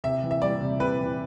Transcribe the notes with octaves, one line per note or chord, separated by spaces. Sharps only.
C3 E5
E3
E5
G3 D5
C3
C3 B4
E3